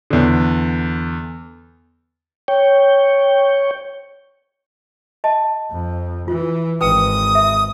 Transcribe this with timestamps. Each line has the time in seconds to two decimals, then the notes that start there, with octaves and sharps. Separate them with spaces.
0.10 E2 D3
2.48 C#5 G5
5.24 D#5 A5
5.71 F2
6.28 E3 F4
6.81 G#1 B4 G5 D#6
7.35 E5